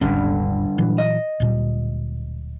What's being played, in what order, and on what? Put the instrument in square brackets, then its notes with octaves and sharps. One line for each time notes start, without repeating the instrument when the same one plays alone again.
[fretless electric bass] D#1 G#1 C#4 [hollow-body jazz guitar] G2 D3
[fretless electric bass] A#2 E3 F#3
[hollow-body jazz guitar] D#5
[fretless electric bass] D1 A#2 G3